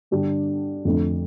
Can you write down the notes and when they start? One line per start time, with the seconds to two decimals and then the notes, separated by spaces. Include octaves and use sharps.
0.11 G2 D3 G3 D4
0.85 F2 D3 A3